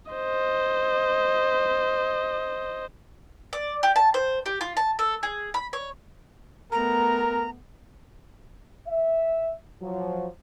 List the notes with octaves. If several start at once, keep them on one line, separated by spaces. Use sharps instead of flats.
C5 D#5
D5
G4
A5
C5
G4
F4
A5
A4
G#4
B5
C#5
A3 B3 A#4 A#5
E5
F3 F#3